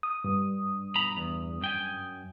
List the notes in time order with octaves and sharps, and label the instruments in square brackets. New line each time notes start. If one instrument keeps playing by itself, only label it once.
[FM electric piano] D#6
[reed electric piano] G2
[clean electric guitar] B1 A#5 B5
E2
F#2 G5 G#5